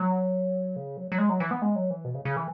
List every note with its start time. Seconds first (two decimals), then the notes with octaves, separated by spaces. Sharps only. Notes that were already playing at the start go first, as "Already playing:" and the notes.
Already playing: F#3
0.76 C#3
0.97 F#3
1.12 F#3
1.18 G#3
1.29 F#3
1.40 E3
1.51 B3
1.62 G#3
1.76 F#3
1.90 E3
2.05 B2
2.14 C#3
2.25 C#3
2.36 E3